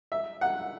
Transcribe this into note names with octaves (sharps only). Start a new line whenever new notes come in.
E5
F#5